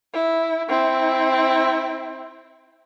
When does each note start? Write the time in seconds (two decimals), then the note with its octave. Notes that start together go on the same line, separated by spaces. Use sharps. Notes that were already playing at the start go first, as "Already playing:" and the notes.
0.14 E4
0.68 C4 E4